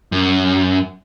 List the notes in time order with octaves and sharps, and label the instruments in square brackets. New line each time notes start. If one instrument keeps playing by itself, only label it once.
[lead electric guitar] F#2